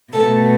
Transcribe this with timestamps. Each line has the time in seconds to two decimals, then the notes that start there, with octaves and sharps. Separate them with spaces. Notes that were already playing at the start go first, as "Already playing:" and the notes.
0.13 B2 A3 A4